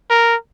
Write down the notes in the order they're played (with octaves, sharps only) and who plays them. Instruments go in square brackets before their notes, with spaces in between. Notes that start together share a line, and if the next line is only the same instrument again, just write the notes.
[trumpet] A#4